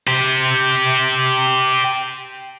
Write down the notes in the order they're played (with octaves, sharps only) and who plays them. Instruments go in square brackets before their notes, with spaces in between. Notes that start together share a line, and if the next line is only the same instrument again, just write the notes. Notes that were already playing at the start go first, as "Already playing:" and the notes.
[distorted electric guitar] G4 C5